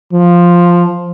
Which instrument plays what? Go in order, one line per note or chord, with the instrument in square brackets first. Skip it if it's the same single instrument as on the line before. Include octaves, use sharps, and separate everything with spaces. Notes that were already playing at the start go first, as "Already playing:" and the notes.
[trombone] F3